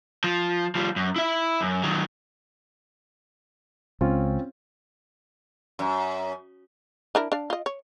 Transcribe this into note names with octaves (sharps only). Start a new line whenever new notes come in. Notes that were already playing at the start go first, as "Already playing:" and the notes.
F3
F3 G3
F#2
E4 E5
F#2
D#3 F#3
C#2 C4 C#4 F4
F#2
D4 E4 A#4
D4 F5
F4 D#5
C#5